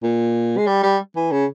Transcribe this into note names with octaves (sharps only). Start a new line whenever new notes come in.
A#2
G#3
G3
G3
E3
C#3